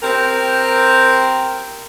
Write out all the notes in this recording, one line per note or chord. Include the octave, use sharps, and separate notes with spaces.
C4 G4 A#4